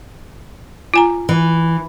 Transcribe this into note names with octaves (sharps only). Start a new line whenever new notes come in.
F4 G#5 A#5
E3